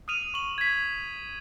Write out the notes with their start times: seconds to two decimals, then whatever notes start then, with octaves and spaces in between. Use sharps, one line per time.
0.08 D#6 F6 D#7 F7
0.34 C#6 F#7
0.58 G#6 B6